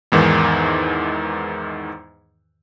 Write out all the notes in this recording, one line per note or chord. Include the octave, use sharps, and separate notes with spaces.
E2 G#2 D#3 E3